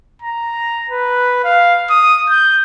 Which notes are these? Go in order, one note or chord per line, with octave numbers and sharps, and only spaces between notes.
A#5
B4
F5
D#6
G6